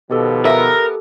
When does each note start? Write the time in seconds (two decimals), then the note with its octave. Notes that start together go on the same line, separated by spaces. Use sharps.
0.11 B2 D#3 F3 G4 A4
0.45 B3 A#4 E5